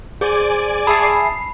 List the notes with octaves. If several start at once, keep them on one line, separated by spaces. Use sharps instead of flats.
G#4 C5 D5 G#5 D6
G#4 E5 A5 B5 C#6 D#6 C7